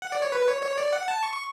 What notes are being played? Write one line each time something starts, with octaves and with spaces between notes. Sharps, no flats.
F#5
D5
C#5
B4
C#5
C#5
D5
F#5
A5
C#6
C#6